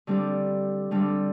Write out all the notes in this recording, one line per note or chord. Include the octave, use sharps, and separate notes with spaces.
D3 G3 C4 G4
D3 G3 C4 G4